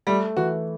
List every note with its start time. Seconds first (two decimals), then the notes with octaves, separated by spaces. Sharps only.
0.07 G3 A3
0.37 E3 F#4